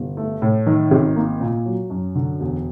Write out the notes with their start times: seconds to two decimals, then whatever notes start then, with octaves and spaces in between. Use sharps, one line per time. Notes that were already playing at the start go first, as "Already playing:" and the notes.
Already playing: G1
0.17 A3
0.42 A2
0.66 D#3
0.91 G#1
1.16 A#3
1.41 A#2
1.66 F#3
1.90 F#2
2.15 D3
2.40 E1